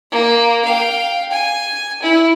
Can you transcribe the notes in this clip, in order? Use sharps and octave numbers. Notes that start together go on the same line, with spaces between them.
A#3
F5 G5
G#5
E4